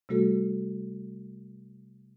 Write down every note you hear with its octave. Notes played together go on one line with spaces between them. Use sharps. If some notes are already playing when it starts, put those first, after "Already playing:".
C3 G3 A3 F#4 A4